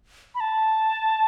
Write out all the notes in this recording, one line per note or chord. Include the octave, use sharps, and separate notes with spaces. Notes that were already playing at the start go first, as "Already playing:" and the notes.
B5
A5